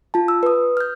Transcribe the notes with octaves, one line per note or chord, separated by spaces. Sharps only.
F4 A5
E6
B4 D#6
F6 G6